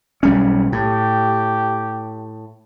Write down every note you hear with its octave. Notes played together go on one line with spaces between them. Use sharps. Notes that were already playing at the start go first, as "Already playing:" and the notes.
B1 G3 C#4
A2 G4